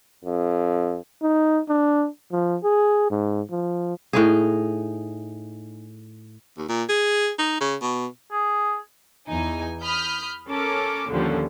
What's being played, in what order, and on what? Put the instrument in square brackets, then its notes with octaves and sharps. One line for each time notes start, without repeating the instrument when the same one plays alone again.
[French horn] F2
[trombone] D#4
D4
F3
G#4
G#2
F3
[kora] A2 D#4 G#4
[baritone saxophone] D#2
A#2
G#4
D#4
C#3
B2
[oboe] G#4
[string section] E2 D#4 G#5
B5 D#6 F6 G6
C#4 A4 A#4 D6
D#2 A#2 D3 F3 G3 C#4